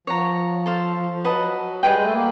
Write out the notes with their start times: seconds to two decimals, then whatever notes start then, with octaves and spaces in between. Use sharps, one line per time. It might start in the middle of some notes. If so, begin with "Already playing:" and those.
0.07 F3 C#5 F#5 A#5
0.66 A4 C5 F5 A5
0.96 F3
1.11 F3
1.24 F#3 B4 D#5 F#5 A5
1.83 G3 G#4 B4 D#5 G5
1.93 G#3
2.03 A3
2.12 A#3